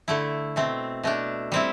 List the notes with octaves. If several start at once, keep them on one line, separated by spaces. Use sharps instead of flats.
D3 A3 E4
B2 A3 C4
B2 A3 D4
G3 C4 E4